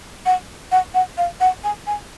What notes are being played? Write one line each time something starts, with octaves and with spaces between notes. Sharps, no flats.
F#5
F#5
F#5
F5
F#5
G#5
G#5